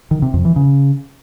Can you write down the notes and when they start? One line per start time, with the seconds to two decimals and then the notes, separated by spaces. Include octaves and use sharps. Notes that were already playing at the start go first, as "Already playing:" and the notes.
0.11 D#3
0.22 C3
0.34 F2
0.45 E3
0.56 C#3